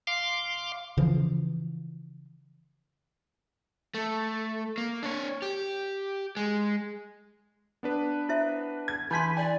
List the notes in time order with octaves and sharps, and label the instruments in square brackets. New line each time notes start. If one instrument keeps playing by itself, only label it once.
[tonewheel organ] F5 C6 D6
[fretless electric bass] C#3 E3 F3
[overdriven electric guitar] A3
A#3
D4 C#5
G4
G#3
[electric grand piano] B3 D4 B4
[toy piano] E4 C5 E5
[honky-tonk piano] G#6
[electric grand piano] E3 [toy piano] D#4 C6 [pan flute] G#5 [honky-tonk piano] B5 G6 B6
[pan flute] D5 [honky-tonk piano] G#5